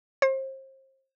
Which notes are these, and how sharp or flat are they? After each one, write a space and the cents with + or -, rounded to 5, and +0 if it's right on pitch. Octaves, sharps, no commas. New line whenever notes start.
C5 +35